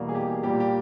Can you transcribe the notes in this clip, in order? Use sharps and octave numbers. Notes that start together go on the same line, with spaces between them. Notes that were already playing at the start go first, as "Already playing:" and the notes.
Already playing: E2 B2 G3 A#3
G#4
G4
A#2 G3 A#3 G4
G4